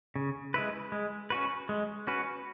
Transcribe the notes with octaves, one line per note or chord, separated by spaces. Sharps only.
C#3
G#3 E4 B4
G#3
C#4 F#4 B4
G#3
C#4 F#4 B4